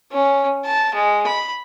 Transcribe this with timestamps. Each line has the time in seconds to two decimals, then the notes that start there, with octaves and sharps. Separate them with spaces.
0.12 C#4
0.65 A5
0.94 G#3
1.27 B5